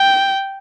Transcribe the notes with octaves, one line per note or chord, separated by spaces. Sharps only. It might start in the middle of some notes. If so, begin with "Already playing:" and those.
Already playing: G5